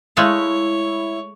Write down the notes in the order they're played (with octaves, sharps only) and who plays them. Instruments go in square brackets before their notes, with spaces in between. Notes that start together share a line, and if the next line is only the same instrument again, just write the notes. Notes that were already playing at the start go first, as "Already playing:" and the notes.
[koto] G#3 A3 F5 [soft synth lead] E4 [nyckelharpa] C#5